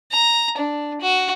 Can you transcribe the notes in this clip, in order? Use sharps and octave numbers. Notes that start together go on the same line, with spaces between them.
A#5
D4
F#4